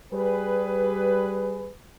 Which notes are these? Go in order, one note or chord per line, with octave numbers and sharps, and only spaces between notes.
G3 G#4 B4